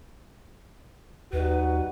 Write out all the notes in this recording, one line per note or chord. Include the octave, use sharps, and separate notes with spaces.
D#2 G3 D#4 F#4 B4